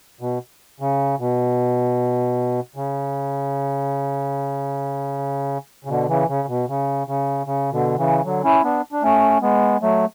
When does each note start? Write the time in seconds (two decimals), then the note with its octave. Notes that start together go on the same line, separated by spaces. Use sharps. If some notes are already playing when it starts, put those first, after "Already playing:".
0.21 B2
0.80 C#3
1.19 B2
2.76 C#3
5.85 C#3
5.89 B2 D3
6.09 C#3 E3
6.28 C#3
6.48 B2
6.68 C#3
7.07 C#3
7.47 C#3
7.72 B2 D3
7.98 C#3 E3
8.24 D3 F#3
8.44 C#4 E4
8.64 B3 D4
8.92 D4
9.03 A3 C#4
9.42 G#3 B3
9.82 F#3 A3